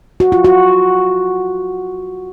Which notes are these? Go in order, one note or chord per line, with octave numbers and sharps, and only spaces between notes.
F#4
F4
F#4